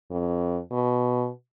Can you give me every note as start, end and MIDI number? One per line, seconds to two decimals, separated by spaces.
0.11 0.58 41
0.71 1.29 47